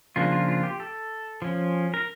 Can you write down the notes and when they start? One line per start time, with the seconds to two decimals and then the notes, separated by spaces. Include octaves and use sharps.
0.16 C#3 F3 A#3 D4 F4
0.32 F4
0.48 F4
0.63 G4
0.80 A4
1.42 F3 C#4
1.94 A#4